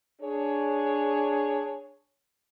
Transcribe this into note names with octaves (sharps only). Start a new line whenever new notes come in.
D4 G#4 C#5